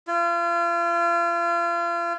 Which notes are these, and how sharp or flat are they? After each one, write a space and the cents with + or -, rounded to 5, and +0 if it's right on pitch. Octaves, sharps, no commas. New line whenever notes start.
F4 -35